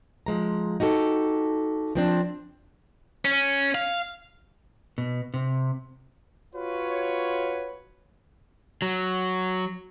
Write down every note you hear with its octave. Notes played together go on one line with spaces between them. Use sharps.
F3 G#3 A#5
D#4 F#4 G4 A4
F3 C4 D4
C#4
F5
B2
C3
F4 F#4 B4 C#5
F#3